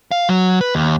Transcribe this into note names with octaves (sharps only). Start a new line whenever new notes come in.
F5
F#3
B4
D#2